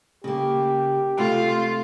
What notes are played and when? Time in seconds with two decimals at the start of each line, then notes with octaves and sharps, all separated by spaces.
0.24 C#3 A#3 G4
1.18 C3 A3 C4 F4